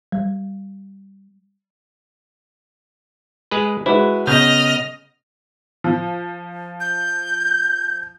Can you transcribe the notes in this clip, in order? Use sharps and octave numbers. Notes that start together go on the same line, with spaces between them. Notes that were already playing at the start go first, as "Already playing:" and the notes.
G3
G#3 G#4 B4
G#3 E4 F#4 B4
C#3 B3 D#5 F6 G6
F3
G6